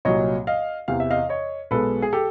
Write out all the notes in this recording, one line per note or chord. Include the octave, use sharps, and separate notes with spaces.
C2 A#2 F#3 C#5 D#5
D#5 F5
E2 C3 E3 F5
E5
D#5 F5
C#5 D#5
B1 B2 G#3 A4 B4
G#4
G4 A4